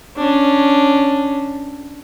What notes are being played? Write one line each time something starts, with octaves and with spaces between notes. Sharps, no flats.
C#4 D4